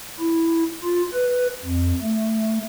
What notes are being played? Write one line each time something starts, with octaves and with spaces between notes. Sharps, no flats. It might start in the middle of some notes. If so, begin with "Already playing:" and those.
E4
F4
B4
F2
A3